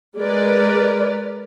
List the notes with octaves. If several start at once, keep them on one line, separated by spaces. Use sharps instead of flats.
G#3 A#4 B4 D5